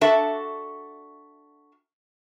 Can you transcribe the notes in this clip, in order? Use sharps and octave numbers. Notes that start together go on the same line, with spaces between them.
D4 F#4 A4 E5 A5